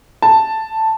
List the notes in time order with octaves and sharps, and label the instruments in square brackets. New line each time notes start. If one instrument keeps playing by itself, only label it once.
[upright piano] A5